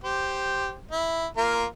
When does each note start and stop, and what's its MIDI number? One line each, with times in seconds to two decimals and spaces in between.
0.04 0.75 67
0.04 0.75 72
0.91 1.26 64
1.37 1.65 58
1.37 1.65 65
1.37 1.65 70